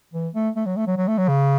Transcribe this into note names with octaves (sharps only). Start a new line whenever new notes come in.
E3
A3
A3
F#3
A3
F#3
F#3
A3
F#3
C#3